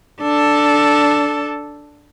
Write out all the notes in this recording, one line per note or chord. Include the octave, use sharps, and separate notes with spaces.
D4 A4